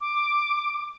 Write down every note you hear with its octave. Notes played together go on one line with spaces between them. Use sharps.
D6